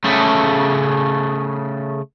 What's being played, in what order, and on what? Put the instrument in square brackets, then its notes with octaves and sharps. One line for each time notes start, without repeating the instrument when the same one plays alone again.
[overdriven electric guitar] C#3 A3